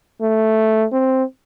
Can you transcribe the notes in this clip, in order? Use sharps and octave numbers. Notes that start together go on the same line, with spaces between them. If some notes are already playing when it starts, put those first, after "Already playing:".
A3
C4